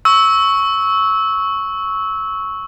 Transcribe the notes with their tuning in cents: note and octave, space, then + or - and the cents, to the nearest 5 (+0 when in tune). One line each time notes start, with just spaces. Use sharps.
C#6 +0 E6 -15